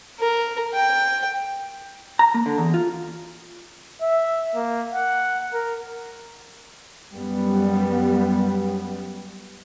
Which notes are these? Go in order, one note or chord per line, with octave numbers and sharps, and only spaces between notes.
A#4
G5
A#5
A#3
D3
E2
F4
E5
A#3
F#5
A#4
F#2 G3 B3